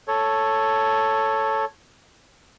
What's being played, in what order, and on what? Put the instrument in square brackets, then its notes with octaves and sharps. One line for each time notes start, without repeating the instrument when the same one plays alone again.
[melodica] A4 C#5